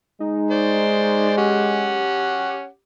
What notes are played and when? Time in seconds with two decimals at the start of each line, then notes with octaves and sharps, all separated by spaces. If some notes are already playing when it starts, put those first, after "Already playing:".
0.20 G#3 D#4
0.51 C5 D5
1.38 C#4 G4 F#5